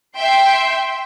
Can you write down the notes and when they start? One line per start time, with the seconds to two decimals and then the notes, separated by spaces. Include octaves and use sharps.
0.16 E5 G5 C6